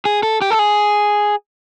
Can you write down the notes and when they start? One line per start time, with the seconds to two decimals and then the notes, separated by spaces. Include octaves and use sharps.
0.05 G#4
0.23 A4
0.42 G4
0.51 A4
0.59 G#4